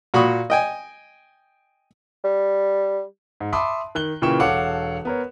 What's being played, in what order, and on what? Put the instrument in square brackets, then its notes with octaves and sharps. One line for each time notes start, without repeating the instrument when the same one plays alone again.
[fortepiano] A#2 F#4 B5 C#6 D#6
D#5 G5 G#5
[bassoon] G3
[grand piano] G#2
E5 A5 B5 C6 D6 D#6
D#3 F#6 G7
A#2 C#3 E3 G5 C#6 E7
E1 A4 C#5 F5 F#5 D6
B3 A#4 C#5